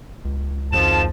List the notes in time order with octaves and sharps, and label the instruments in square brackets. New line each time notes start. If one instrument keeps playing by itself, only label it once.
[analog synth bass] C#2
[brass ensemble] G#1 F3 A5 [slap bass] F2 [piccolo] E7